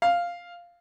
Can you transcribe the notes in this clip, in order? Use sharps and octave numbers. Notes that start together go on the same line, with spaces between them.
F5